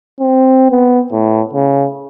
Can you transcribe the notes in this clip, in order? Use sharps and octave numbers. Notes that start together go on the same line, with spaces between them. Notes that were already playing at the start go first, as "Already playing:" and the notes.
C4
B3
A2
C#3